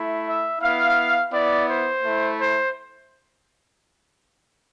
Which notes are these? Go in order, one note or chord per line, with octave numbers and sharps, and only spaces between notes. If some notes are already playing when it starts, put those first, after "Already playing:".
Already playing: A3 E4
E5
B3 E4 F5
B3 E4 D5
C5
A3 E4
C5